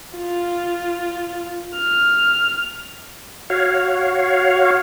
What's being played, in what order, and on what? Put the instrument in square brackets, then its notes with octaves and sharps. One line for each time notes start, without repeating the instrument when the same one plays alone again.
[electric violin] F4
F6
[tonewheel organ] F#4 C#5 F5